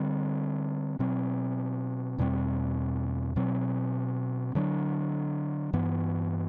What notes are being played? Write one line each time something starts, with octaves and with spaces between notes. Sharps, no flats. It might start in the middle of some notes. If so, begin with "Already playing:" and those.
Already playing: D3 G3 C4
B2 F#3 C4
E2 B2 G3 C4
B2 F#3 C4
D3 F#3 B3 D4
G2 E3 B3